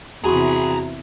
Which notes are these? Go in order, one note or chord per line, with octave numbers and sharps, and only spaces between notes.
E2 C3 F#4 G#4 A#5 B5